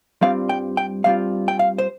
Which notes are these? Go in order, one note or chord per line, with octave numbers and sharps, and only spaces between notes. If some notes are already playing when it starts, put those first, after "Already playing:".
G2 G3 C4 F4 F5
G5
G5
G2 G3 C4 F4 F5
G5
F5
C5